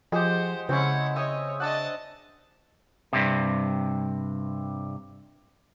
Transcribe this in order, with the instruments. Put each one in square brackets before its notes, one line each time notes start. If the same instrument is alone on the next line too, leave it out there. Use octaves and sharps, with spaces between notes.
[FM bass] F3 [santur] G#3 G4 [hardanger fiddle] C5 F#5
[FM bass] C#3 [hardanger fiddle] G#3 F#5 [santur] C4 C#4 E4
[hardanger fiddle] C#5 D#5 [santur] E5 D#6
[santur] D4 F#5 [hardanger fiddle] D#5 A5
[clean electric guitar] G2 C3